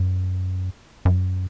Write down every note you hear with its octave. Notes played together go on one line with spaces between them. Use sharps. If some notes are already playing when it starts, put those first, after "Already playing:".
Already playing: F#2
F#2